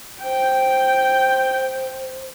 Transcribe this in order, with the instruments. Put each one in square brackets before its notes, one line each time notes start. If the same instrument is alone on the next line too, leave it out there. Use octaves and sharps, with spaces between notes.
[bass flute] C5 [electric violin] G5